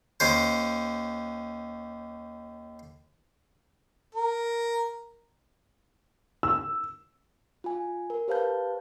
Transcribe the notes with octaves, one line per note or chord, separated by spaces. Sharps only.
D#2 C#4 C5
A#4
E6
F4 G#5
A#4
G4 B4 C5 F5 A5 G6